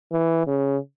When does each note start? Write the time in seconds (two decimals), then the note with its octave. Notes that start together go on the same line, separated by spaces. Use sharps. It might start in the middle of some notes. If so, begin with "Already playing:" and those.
0.12 E3
0.47 C#3